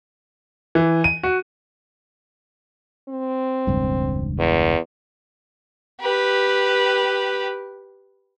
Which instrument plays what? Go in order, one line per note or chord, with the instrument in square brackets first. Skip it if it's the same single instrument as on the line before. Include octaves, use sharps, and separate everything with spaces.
[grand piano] E3
D#7
F#4
[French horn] C4
[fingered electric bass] E1 C#2 G2
[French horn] E2
[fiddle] G4 B4